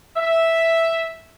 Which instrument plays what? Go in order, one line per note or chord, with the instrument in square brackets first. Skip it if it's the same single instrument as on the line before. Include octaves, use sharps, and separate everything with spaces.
[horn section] E5